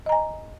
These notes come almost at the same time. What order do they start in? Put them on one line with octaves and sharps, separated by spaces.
D#5 A#5 G#5